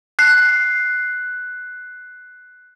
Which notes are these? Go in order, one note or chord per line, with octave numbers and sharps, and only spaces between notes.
F#6 C7